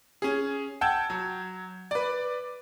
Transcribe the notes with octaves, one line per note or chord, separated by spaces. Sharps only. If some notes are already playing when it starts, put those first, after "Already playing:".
C#4 G#4
F#5 G5 A5 E6 G6 G#6
F#3
B4 D5